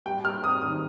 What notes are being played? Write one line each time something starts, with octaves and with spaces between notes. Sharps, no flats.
G3 G5
G3 F6
C4 D#6
D#3 D#6